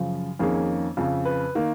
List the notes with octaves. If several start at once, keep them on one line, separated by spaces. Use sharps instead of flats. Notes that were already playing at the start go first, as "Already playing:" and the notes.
Already playing: F#2 C#3 F3
F2 D#3 A#3 C#4 G#4
F2 C#3 F3
B4
D#3 A#3